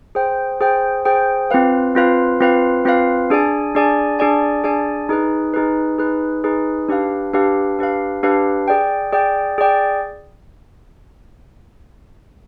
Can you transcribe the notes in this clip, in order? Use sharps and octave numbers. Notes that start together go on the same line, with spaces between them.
G#4 C5 G5
G#4 C5 G5
G#4 C5 G5
C4 F4 B4 F5
C4 F4 B4 F5
C4 F4 B4 F5
C4 F4 B4 F5
D4 G#4 D5 G#5
D4 G#4 D5 G#5
D4 G#4 D5 G#5
D4 G#4 D5 G#5
D#4 G#4 B4
D#4 G#4 B4
D#4 G#4 B4
D#4 G#4 B4
D4 G4 B4 F5
D4 G4 B4 F5
D4 G4 B4 F5
D4 G4 B4 F5
G#4 D5 G5
G#4 D5 G5
G#4 D5 G5